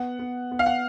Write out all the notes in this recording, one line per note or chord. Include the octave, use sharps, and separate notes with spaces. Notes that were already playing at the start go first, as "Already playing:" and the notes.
Already playing: B3 F#5
B3
B3
F5
F#5